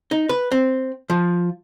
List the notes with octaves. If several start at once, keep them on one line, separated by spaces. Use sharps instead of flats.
D#4
B4
C4
F3